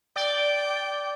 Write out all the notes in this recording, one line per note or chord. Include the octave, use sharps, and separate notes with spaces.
D5 G5